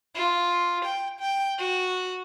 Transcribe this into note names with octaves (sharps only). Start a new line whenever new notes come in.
F4
G5
G5
F#4